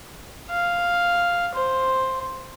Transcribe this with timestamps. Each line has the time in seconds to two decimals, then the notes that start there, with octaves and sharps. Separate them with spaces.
0.51 F5
1.55 C5